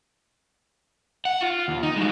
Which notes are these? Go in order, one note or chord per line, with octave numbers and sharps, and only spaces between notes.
F#5
F4
D#2
D#4
F#3 G#3